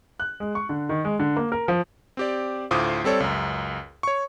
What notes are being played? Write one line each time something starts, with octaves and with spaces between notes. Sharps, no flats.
F#6
G#3
C#6
D3
D#3
G#3
D3
A#3
A#4
F3
C4 G4 D5
D2 A2 F4 C5 D6 D#6
G3 C4 A4 C#5 D5
C#2 F#2
C#5 C#6